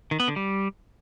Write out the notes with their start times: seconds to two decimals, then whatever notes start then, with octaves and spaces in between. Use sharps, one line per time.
0.11 D#3
0.20 B3
0.28 D3
0.36 G3